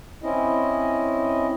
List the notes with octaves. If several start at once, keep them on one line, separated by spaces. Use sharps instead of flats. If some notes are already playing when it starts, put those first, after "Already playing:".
C4 C#4 E4 D#5